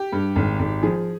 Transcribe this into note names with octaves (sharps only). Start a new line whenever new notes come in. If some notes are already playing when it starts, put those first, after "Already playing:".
Already playing: G4
G2
G#1
G#1
F3 G#4